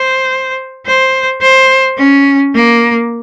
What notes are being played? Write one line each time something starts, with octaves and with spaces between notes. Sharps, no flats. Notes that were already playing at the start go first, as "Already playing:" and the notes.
Already playing: C5
C5
C5
C#4
A#3